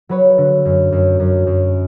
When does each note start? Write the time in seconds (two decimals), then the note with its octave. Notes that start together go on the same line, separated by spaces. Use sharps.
0.09 F#3 B4 C#5
0.38 D3
0.65 F#2
0.92 F#2
1.20 F#2
1.47 F#2